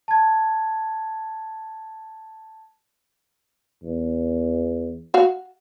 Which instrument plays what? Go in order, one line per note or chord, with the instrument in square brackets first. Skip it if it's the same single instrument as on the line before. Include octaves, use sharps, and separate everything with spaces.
[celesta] A5 G#6
[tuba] E2
[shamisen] F#4 F5